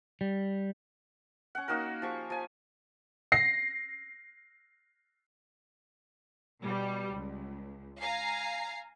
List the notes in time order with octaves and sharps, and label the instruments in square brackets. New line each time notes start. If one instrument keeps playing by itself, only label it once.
[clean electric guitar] G3
[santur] C#4 F#5
A#3 D#4 F#4 A#4
F3 G4 C#6
F3 G#5
[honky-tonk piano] A#6 C7
[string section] B2 G3
C#2
F5 G#5 A#5 C7